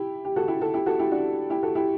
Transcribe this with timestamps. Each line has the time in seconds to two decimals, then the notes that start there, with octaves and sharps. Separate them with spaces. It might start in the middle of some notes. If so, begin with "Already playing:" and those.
Already playing: E4 G4
0.25 G4
0.36 F#4 A4
0.48 E4 G4
0.61 F#4 A4
0.74 E4 G4
0.86 F#4 A4
0.99 E4 G4
1.11 D4 F#4
1.50 E4 G4
1.63 F#4 A4
1.75 E4 G4